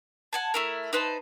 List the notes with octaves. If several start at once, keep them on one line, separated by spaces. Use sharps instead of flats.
F#5 G#5 A5
A3 E4 A#4
D#4 B4 C5 A5